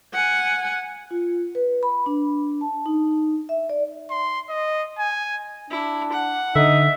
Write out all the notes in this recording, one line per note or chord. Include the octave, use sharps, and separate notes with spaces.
F#5 G#5
F4
B4
B5
D4
A5
D#4
E5
D5
C6
D#5
G#5
D4 E4
F#5
D3 D#4 E5